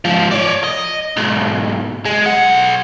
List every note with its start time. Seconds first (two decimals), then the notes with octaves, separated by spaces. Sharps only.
0.05 G#2 F3
0.31 C#5 D5
0.64 D#5
1.17 B1 G#2
2.05 G#3
2.26 B1 F#5